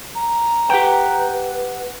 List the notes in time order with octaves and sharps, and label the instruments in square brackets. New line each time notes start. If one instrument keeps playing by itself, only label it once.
[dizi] A#5
[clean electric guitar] G4 F#5 G5 [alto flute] B4